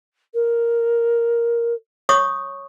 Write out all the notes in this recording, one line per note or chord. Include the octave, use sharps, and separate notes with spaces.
A#4
C#5 C#6 D#6